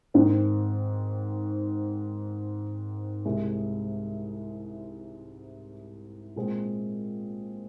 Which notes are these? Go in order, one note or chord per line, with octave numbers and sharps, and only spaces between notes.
G#2 D#3 C4 D#4
C2 C3 G#3
A#2 G#3 C4 F4